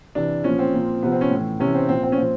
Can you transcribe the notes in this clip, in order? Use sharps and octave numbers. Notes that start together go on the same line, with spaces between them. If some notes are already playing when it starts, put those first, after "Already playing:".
C3 E3 D4
A#2 F3 C#4
C4
A#2 F3
C3 F3 B3
C4
C#4
A2 E3
C3 E3 C#4
C4
A#2 F3 C4
C4
C#4
A#2 F3 C4